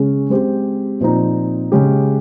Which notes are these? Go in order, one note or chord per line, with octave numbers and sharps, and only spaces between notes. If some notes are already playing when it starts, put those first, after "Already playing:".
Already playing: C#3 G#3 C#4 G#4
G#3 C4 G4
A#2 F3 C4 D#4
C#3 G#3 C#4 G4